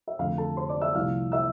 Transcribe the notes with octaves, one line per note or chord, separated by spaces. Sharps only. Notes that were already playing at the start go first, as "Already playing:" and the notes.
E5
F2 D3 A3 F5
A4 A5
C5 C6
D5 D6
E5 E6
C2 C3 F3 A3 F5 F6
E5 E6